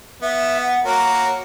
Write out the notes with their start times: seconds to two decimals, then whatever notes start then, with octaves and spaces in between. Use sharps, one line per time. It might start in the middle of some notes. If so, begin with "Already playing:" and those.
0.22 B3 E5
0.62 F#5
0.85 A#3 F#4 A#4 C#5